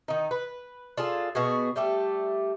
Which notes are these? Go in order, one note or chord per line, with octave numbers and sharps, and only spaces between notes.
D#3 D#4
B4
D4 F4 G#4 A4
B2 B3 F#4 G#4
G3 A3 G4